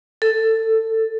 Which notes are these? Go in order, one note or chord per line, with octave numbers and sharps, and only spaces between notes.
A4